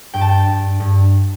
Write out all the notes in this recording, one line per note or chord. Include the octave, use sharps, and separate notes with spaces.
G2 G5
A5
G5
G2
G2